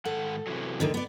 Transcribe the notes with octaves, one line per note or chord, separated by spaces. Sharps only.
G#2 D#3 A4 F#5
C3 E3 F#3
D#2 D3 D#3
B3 D5